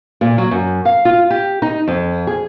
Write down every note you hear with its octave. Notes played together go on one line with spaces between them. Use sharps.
A#2
F#3
F#2
F5
F4
G4
D#4
F2
G#4